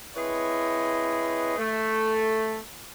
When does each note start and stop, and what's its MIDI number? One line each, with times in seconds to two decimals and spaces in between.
0.16 1.54 60
0.16 1.54 64
0.16 1.54 68
0.16 1.54 71
0.16 1.54 73
0.16 1.54 75
1.58 2.56 57